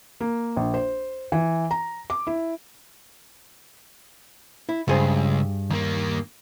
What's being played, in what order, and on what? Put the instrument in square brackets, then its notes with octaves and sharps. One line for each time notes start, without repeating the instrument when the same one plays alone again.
[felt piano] A#3
A#1
C5
E3
A#5
D6
E4
[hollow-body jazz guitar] E4
[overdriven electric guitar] C#2 [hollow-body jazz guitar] G2 G#4 C5
[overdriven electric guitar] D#2 A#3